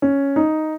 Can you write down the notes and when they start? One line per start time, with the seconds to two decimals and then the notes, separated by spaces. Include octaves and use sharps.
0.02 C#4
0.36 D#4